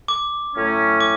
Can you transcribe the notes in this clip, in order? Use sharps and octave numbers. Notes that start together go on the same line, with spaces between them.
D6
A2 F#3 A3 C#4
D6